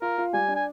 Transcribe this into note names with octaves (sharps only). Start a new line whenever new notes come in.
F4 A#4
F4
G3 G#5
D4
G#5